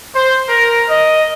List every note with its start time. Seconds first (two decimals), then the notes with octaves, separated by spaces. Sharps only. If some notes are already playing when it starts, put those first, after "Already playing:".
0.13 C5
0.48 A#4
0.89 D#5